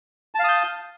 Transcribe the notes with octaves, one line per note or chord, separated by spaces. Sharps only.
F5 A5 D#6 G6